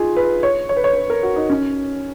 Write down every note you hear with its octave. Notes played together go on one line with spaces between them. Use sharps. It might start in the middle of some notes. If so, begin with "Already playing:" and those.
Already playing: D#4 F4 G#4
B4
C#5
C#5
B4
C#5
B4
A#4
F#4
D#4
C#4